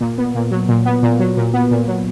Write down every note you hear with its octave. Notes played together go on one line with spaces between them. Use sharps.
A#2
B3
A#2
F#3
A#2
B3
A#2
F#3
A#2
B3
A#2
F#3